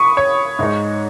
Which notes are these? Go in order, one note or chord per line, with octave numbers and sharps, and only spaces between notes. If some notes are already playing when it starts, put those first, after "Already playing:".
Already playing: B5 C#6 D#6
C#5
G#2 G#3 D#4